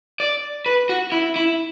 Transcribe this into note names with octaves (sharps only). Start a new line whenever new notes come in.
D5
B4
F#4
E4
E4